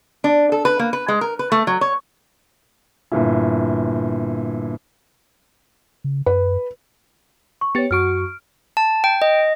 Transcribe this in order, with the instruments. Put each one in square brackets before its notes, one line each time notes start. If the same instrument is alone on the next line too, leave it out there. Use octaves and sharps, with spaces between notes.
[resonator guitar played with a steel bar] D4
A4
B4
A#3
B4
G#3
A#4
B4
A3
F#3
C#5
[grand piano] G1 A#2 E4
[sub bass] C#3
[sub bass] F#2 [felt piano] B4
[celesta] C#6
[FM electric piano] B3 G4 A6 [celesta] C#5 C#7
[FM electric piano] F#2 F#4 C#6 [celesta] F6 D7
[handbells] A5
G5
D#5